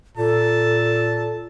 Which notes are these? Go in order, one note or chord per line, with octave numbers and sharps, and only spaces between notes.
A#2 A4 A5